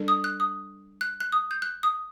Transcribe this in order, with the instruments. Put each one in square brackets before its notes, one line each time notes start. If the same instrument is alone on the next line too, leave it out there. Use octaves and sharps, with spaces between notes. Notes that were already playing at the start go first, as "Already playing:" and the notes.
Already playing: [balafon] G3 D4 A4
[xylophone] D#6
F#6
D#6
F#6
F#6
D#6
G6
F#6
D#6